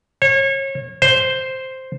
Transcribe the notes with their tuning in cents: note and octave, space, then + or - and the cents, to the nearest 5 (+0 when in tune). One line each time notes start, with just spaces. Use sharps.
C#5 -35
C5 +0